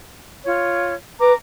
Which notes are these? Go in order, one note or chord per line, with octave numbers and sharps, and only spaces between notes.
F4 C#5
B4 A#5 D6